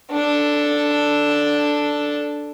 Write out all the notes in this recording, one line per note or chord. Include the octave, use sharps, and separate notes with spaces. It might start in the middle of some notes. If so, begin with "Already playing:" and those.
D4 A4